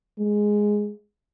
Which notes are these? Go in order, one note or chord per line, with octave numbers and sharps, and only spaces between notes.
G#3